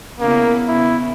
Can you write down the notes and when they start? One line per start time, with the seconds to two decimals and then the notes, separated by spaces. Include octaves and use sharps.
0.20 C#3 A#3 B3 E4
0.68 C#3 B3 E4